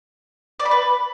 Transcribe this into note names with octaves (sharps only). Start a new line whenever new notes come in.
D5
B5
B4